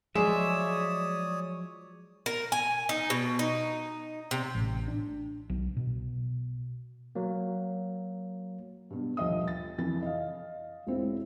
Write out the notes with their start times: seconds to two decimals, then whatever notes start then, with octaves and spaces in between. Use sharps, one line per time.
0.15 F3 F#3 G#3 C#5 D5 E5 D#6
2.26 A#4
2.52 G#5
2.89 D#4
3.10 B2
3.39 D#4
4.31 C3
4.55 A1
4.88 D4
5.50 B1
5.77 B2
7.15 F#3 A#3
8.90 G2 B2
9.17 D#1 F3 D#5 E5 D#6
9.48 A6
9.78 F2 E3 A6
10.03 D#5 F5
10.87 E1 C4 E4